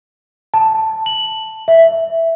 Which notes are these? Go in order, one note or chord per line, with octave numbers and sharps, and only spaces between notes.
A5
F#7
E5